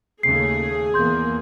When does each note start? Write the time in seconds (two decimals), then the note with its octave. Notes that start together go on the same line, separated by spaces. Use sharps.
0.23 D#2 C#3 A3 G#4 C7
0.94 E2 A#3 C6 G6